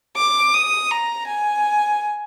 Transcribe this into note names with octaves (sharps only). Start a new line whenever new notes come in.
D6
D#6
A#5
G#5